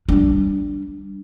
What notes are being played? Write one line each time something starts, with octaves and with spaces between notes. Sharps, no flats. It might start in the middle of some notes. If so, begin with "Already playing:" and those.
G3 D4